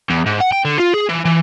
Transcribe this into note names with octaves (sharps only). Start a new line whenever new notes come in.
E2
G#2
F#5
G5
D3
F4
G#4
E3
E3